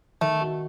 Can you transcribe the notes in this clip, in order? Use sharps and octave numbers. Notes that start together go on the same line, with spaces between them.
D#3 A3
F#4